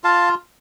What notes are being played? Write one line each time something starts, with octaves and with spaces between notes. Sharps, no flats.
F4 F5 A5